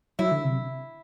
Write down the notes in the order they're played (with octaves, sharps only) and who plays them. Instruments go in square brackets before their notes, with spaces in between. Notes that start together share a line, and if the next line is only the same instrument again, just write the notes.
[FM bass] F#3 [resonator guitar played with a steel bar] E4
[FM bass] D3
C3